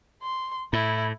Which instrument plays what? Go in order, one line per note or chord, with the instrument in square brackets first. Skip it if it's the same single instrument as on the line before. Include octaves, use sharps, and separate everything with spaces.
[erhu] C6
[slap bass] A2 [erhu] E4